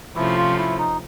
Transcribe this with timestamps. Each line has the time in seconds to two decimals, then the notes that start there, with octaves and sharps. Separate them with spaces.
0.16 C3 F3 A3 C#4 E4
0.37 F4
0.58 E4
0.79 D#4